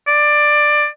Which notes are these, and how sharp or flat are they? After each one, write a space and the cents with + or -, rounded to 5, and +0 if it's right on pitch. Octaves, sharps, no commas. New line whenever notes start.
D5 +15